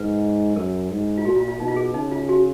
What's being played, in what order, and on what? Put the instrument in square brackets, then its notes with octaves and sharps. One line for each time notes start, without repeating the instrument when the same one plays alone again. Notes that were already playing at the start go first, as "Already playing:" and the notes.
Already playing: [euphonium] G#2 [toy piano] B4
[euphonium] F#2 [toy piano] A#4
[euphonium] G#2
[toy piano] F4
[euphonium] A#2 [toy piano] F#4
[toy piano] F4
F4
[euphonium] B2 [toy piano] D#4
[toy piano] F4
G#4
[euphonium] C#3 [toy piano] D#4
[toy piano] F4
F#4